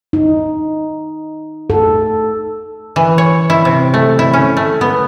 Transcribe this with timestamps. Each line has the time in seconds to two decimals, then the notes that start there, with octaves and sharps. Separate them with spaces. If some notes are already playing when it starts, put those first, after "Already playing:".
0.13 D#4
1.70 A4
2.96 E3
3.18 C#5
3.50 E4
3.65 C3
3.94 A3
4.19 E4
4.33 C#4
4.57 A3
4.81 B3